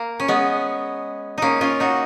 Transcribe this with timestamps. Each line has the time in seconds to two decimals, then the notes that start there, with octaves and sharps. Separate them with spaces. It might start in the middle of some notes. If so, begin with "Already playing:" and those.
Already playing: A#3
0.20 C#4
0.28 G#3 B3
1.38 A#3 C#4 D#4
1.61 C#4 F4
1.80 D#4 F#4